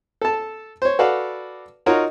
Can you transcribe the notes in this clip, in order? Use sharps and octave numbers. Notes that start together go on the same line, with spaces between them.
A4 A5
C5 C#5
F#4 A4 B4 D5 F5
D#4 F4 F#4 A#4 C#5